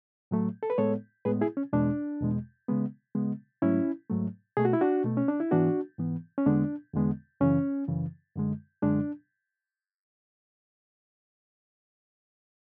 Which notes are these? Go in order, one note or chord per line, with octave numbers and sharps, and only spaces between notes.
A2 F#3 A3
A4
B4
A2 G#3 B3 A4 C#5
A2 G#3 B3 G#4 B4
E4 G#4
C#4
E2 B2 G#3 D4
E2 B2 G#3
C#3 G#3 B3
C#3 G#3 B3
G#2 F#3 A3 C#4 E4
G#2 F#3 A3
B2 A3 G#4
F#4
E4
D4 F#4
B2 A3
C#4
D4
E4
G#2 E3 B3 D4 F#4
G#2 E3 B3
C#4
E2 D3 G#3 B3 D4
E2 D3 G#3 B3
F#2 C#3 E3 C#4
F#2 C#3 E3
F#2 D3 G#3
F#2 D3 G#3 D4